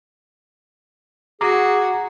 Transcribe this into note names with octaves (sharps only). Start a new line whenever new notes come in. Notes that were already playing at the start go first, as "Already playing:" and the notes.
F#4 G#4 A#5 D6